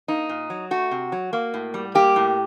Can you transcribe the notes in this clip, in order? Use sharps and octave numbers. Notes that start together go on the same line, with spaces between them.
A#3 D#4
A#2
F#3
A3 F#4
C3
F#3
A#3
A2
G3
A#3 G4
A2